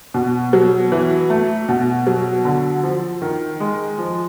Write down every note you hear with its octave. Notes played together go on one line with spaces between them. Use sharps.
B2
F#3
E3
A3
B2
F#3
D3
F3
D#3
G#3
F3